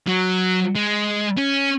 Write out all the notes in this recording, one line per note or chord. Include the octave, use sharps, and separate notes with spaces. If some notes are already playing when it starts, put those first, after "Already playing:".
F#3
G#3
C#4